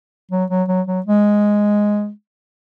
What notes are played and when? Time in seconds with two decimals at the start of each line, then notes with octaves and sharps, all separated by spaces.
0.31 F#3
0.50 F#3
0.68 F#3
0.87 F#3
1.06 G#3